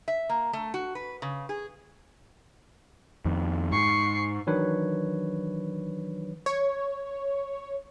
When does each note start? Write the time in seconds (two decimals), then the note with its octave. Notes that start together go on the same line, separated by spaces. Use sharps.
0.08 E5
0.29 A#3
0.53 A3
0.74 F#4
0.95 B4
1.22 C#3
1.49 G#4
3.25 F2 D#3
3.72 G#2 C#6 C7
4.47 D#3 E3 F#3 D4 B4 C#5
6.46 C#5